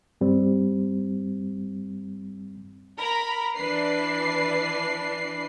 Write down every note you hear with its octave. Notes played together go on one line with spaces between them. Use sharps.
G2 G3 C4
A#4 A#5 B5
E3 D4 B4 C7